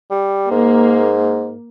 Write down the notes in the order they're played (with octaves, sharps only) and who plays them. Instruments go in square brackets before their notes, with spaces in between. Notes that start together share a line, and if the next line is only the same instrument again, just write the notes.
[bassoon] G3
[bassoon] G#2 [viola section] A#3